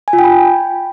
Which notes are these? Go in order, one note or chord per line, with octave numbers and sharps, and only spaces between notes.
G#5
F4
G5
B5